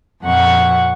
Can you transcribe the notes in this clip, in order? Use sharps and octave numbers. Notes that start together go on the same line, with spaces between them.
F2 A#2 F#5 C#6